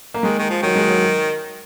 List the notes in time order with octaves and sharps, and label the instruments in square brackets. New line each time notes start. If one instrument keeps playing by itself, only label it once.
[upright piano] A#3
[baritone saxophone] D#3 [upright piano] G#3
[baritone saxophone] D#3
F3
[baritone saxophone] D#3 [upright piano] F#3
[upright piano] G#3
F#3